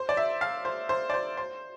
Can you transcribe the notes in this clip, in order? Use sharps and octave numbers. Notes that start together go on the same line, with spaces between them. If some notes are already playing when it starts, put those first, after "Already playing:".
Already playing: C5
D5
E5
F5
C5
C5
D5
C5
C5